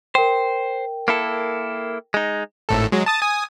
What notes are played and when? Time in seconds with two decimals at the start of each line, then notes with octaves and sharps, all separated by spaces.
0.15 A#4 C5 G5
1.08 A#3 E4 A4
2.14 G#3 D#4
2.69 G#1 A2 A4
2.92 F#3 G#3
3.06 A5 D#6 A6
3.22 G#5 D#6